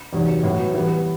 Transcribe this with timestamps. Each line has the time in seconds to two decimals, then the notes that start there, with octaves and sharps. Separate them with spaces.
0.13 E2 C3 D#3 F#3
0.43 A2 F#3 B3 E4
0.74 E3 G3 B3